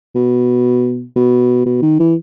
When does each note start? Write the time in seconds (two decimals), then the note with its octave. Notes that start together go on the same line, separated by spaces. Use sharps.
0.15 B2
1.16 B2
1.66 B2
1.82 D#3
1.99 E3